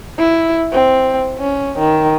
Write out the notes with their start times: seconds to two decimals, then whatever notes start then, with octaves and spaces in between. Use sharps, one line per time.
0.18 E4
0.72 C4
1.39 C#4
1.79 D#3